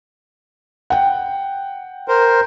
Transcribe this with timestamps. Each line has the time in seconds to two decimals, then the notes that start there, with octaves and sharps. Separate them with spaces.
0.90 F#5 G5
2.08 A#4 C5